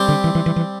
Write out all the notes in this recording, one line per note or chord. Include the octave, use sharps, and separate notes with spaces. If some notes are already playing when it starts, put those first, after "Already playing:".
Already playing: G3 C4 G4
D3
E3
E3
E3
E3